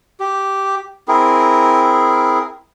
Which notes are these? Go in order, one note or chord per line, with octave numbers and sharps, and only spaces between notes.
G4
C4 E4 G#4 A#4